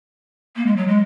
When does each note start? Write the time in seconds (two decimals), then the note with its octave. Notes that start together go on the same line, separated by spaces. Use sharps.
0.56 A#3
0.66 G#3
0.76 F#3
0.88 G#3